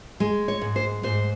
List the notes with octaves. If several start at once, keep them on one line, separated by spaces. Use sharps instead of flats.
G#3
C#5
G#2
C5
G#2 C5